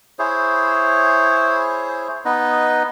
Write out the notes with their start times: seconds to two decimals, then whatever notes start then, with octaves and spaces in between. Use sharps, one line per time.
0.19 E4 G#4 C5 C#5
2.25 B3 D#4 B4 D#5